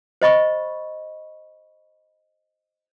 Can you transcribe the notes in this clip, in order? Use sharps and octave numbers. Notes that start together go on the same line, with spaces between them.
C5 D#5 B5 C#6